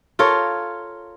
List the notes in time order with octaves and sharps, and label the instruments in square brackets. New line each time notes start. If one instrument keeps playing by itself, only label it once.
[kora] F4 A4 A#4 C#5